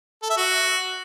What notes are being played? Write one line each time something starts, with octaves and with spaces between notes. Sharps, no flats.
A4
E5
F#4